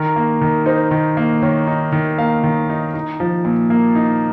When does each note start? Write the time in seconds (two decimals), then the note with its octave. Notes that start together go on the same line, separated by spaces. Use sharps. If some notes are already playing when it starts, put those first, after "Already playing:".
Already playing: D#3 A#4
0.16 A#3
0.41 D#3
0.66 D#4 C5
0.91 D#3
1.17 A#3
1.43 D#3 C#5
1.67 D#4
1.92 D#3
2.18 A#3 F5
2.43 D#3
2.70 D#4
2.94 D#4
3.20 F3
3.45 A#2
3.70 A#3
3.95 D#4